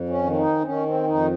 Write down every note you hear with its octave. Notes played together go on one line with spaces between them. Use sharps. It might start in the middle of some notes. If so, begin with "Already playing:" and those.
Already playing: F2
C#4
D#3
C#4
D#4
C4
D#3 C#4
C4
F2 D#4